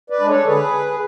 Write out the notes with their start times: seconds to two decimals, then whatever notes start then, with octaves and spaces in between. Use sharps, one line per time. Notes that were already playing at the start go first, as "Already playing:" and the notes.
0.10 B4 D5
0.20 G#3 D4
0.28 A4 C#5
0.47 D3 G#4 B4